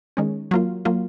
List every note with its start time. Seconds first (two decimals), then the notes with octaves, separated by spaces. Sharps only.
0.17 D#3 G#3 C#4
0.51 F#3 A#3 F4
0.85 F#3 A#3 F4